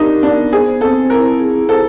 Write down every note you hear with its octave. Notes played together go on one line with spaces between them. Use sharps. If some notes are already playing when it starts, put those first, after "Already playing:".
Already playing: D4 D#4 G4 A#4
B3 D4
G#4 C5
C4 A4
E4 A#4
G#4
A4 C5